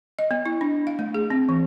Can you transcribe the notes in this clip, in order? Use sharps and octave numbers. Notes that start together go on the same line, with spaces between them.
D#5
B3
E4
D4
F5
A3
G#4
C4
E3